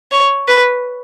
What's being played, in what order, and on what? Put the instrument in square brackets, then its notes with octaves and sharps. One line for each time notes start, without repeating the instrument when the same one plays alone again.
[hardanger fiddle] C#5
B4